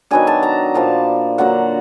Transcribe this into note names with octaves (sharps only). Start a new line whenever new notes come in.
D#3 F#3 B3 D4 G#5
A5
A#5
A#2 F3 A#3 A5
D3 F#3 A#3 F#5